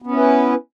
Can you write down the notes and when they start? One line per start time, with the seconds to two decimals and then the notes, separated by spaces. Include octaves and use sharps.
0.02 B3
0.07 C#4
0.11 E4
0.16 B4